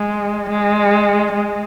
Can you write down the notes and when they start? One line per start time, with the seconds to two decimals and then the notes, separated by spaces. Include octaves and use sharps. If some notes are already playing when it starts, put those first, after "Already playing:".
Already playing: G#3
0.50 G#3
1.33 G#3